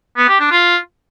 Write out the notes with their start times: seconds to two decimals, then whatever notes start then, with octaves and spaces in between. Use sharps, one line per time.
0.17 B3
0.28 G4
0.40 D4
0.51 F4